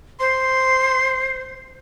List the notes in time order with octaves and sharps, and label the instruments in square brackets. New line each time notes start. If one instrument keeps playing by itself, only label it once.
[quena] C5 [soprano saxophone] C6